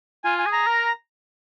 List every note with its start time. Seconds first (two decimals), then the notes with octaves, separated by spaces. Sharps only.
0.24 F4 G#5
0.39 G#5
0.46 G#4
0.53 A#5
0.67 A#4